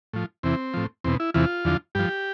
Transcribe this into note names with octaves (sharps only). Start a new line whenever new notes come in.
A2 F3
E2 C3 E3 C4
A2 F3
E2 B2 C4
E4
E2 C3 E3 F4
E2 D3 F3
G2 F3 G4